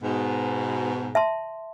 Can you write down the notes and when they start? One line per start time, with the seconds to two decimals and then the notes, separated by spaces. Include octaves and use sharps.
0.03 G#2 B2
1.15 E5 A5 C6